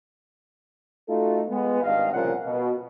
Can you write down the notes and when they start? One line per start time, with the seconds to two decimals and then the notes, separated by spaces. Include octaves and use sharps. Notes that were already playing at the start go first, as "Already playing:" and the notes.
1.08 A3 D#4 F4 F#4 A4
1.48 G#3 B3
1.82 G#1 G2 D#5 F5
2.13 C2 A#2 C#3 F3 A#4 F#5
2.44 B2